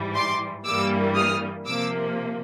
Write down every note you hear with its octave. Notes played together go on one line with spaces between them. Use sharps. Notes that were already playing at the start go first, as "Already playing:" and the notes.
Already playing: G#2 E3 G3
C6 D6
G2 E3 G3 A#3 D6 E6
D#6 F6
C3 F3 A#3 D6 E6